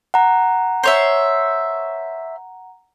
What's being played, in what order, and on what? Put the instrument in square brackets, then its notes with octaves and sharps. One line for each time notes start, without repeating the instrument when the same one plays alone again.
[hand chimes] F#5 A#5
[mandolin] C5 C#5 E5